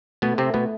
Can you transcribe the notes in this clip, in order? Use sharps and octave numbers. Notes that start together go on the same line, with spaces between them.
B2 A3 B3
C3 C4
B2 A3 B3